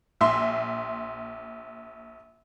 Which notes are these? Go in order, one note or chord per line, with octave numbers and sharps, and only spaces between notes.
A#1 E5 C6